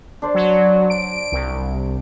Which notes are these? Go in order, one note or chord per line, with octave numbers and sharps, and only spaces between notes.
D4 C5 D5
F#3
D7
C2